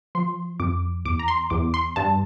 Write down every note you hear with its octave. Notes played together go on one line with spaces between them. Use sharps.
F3 C6
F2 D6
E2 D6
A#5
C6
E2 D6
C6
G2 A5